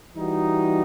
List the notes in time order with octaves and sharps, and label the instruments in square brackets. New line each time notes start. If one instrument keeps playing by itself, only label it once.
[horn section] E3 G3 D#4 F#4